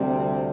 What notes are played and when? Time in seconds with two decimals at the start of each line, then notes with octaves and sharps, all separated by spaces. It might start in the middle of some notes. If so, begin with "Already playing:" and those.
Already playing: D2 C3 G3 C4